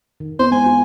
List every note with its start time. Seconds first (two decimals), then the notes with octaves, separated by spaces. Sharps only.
0.20 D#3
0.39 B3 C4 E4 C5
0.52 G#3 G#5
0.66 F4